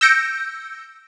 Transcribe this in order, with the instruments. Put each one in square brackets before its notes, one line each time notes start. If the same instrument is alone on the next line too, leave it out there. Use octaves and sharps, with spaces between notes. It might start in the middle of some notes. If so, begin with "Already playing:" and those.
[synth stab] E6 G6 A#6 C#7 D7